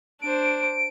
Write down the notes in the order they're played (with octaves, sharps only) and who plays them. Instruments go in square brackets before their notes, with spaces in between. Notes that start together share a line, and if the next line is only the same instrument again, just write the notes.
[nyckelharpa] D4 C5 [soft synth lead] D7